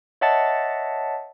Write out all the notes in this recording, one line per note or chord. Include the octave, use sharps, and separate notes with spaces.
C#5 D#5 E5 F#5 A5 A6